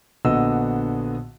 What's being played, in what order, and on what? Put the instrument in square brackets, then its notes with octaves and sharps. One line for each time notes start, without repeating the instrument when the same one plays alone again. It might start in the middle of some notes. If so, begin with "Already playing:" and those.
[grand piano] A#1 D3 B3 F#4 D#5 E6